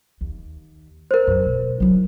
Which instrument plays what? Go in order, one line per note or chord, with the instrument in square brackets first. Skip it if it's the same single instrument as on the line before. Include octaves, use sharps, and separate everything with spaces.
[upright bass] D#2
[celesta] A#4 C5
[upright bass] F#2
B2
F#3 E4